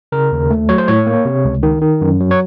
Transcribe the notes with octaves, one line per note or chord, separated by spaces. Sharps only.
C#3 A#4
D#2
A3
F#3 C#5
C5
A2 C#5
A#3
C3
C#2
D#3
D#3
F#2
F#3
C#5